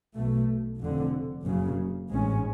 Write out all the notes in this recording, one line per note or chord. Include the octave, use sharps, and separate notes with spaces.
B1 B2 A3
F1 F2 D3
F#1 F#2 C#3
A1 G#2 G#3 C#4